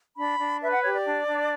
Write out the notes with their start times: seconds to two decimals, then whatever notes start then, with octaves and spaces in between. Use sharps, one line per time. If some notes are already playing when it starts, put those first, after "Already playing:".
0.17 D4 B5
0.38 D4
0.61 B4 E5
0.71 F#5
0.83 G4 C#5
0.94 D5
1.04 D4
1.27 D4